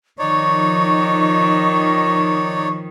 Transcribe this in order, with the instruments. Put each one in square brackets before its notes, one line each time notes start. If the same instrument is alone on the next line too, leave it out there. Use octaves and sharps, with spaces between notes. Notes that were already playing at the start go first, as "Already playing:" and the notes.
[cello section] D#3 F3 [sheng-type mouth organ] D#4 C#5 D5 [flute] C#6